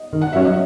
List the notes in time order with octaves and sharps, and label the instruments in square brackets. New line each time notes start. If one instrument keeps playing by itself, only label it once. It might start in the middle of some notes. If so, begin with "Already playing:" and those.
Already playing: [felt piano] D#5
[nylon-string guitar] D#3
[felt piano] F#5
[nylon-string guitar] F#3 C#4 F#4 C#5 [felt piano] E5
[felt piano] D#5